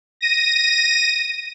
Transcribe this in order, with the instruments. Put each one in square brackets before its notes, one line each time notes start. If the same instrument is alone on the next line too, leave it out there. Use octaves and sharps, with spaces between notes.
[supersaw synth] A#6 D#7